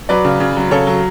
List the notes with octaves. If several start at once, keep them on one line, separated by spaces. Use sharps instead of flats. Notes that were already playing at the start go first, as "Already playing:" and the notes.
F#3 B4 D5
C#3
C#3
F#3
C#3 A4 C#5
F#3